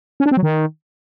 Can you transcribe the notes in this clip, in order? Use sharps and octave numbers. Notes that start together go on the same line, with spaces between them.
C#4
D4
C4
F#3
D#3